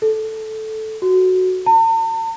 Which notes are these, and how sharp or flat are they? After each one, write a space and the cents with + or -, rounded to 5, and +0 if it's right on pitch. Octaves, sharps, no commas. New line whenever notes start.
A4 -10
F#4 +0
A5 +45